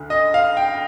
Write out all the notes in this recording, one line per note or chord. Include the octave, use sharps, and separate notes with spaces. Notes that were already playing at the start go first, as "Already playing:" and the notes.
Already playing: D2 D3
D#5
F5
G5